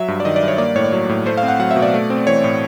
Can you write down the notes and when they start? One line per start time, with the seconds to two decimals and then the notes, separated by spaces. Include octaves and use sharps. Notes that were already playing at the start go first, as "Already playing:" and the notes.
Already playing: F#3 E5
0.08 G2
0.20 D5
0.25 D#3 D#5
0.36 D5
0.43 G2
0.48 C#5
0.58 A#3 D5
0.75 A2 C#5
0.84 D5
0.92 F#3 C#5
1.09 A2
1.26 A3 C5
1.37 F5
1.43 C4
1.48 F#5
1.60 F#3 F#5
1.71 E5
1.76 B2
1.82 D5
1.94 A3
2.10 C4
2.27 E3 C#5
2.44 A2